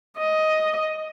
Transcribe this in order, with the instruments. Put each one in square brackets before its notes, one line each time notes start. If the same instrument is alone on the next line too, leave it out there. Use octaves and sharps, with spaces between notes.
[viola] D#5